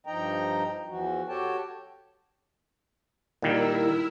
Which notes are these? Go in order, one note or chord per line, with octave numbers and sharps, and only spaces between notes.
G2 F3 D#4 D#5 G5 A#5
E2 E3 F3 F#4
F#4 G4 A4 C#5 G5 A5
A#2 D#3 G3 E4 A#4 E6